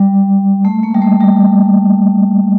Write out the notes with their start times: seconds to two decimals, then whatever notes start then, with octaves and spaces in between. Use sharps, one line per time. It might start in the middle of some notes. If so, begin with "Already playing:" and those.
Already playing: G3
0.65 A3
0.83 A#3
0.94 G3
1.02 A3
1.21 G3